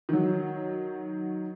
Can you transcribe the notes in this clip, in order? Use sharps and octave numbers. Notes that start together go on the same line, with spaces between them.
D#3 F#3